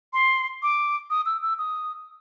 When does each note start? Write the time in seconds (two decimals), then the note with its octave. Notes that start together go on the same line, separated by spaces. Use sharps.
0.13 C6
0.63 D6
1.10 D#6
1.26 E6
1.42 E6
1.59 D#6